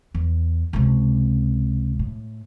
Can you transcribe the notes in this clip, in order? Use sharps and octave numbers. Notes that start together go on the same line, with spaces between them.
E2
C#2 C3
A2